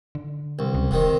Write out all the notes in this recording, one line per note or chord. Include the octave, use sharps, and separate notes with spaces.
D3
C2
C#2
E1 C3 D#3